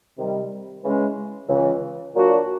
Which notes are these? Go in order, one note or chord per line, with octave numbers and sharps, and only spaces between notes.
C3 D#3 G3
C#3 E3 G#3 C#4
C#2 C#3 E3
A#2 F#3 A#3 D4 F#4